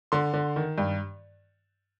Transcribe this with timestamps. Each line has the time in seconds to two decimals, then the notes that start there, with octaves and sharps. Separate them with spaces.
0.12 D3 C6
0.34 D3
0.56 D#3
0.78 G2